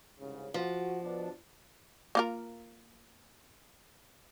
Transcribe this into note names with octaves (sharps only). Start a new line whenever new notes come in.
C2 G#2 C#3
F3 F#4
B2 D4
A#3 F4 A#4